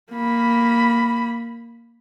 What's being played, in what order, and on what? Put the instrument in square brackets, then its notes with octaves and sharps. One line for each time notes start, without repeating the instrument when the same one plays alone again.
[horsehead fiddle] A#3 B5